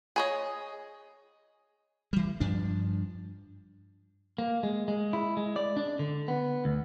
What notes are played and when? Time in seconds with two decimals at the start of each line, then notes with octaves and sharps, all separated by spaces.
0.16 G#4 C#5 D#5
2.13 E3 G3
2.40 G2 F3 D4
4.38 A#3
4.63 G#3
4.88 G#3
5.13 E4
5.37 G#3
5.56 D5
5.77 D4
5.99 D3
6.28 B3
6.65 D2